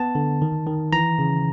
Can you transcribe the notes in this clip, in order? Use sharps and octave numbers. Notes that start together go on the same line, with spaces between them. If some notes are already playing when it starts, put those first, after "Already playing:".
Already playing: B3 A5
D3
D#3
D#3
E3 A#5
C#3